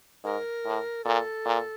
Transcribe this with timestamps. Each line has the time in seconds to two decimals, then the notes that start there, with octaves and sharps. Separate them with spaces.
0.24 G#2 A#4
0.65 A2
1.04 A#2 A4
1.45 A#2